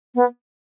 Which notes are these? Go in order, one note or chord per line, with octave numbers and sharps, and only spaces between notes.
B3